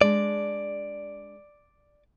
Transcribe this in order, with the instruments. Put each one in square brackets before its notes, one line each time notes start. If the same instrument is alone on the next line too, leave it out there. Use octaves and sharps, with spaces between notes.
[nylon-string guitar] G#3 D4 [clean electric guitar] D5